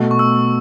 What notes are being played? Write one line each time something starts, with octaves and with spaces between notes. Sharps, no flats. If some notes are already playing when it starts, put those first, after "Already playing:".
Already playing: B2 A3 F#4
C#6
E6